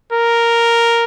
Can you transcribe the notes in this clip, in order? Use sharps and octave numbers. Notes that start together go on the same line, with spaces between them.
A#4